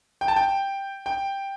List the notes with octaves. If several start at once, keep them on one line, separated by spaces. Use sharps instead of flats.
G5
A5
G5
G5